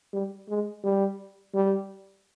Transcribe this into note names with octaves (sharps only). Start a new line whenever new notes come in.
G3
G#3
G3
G3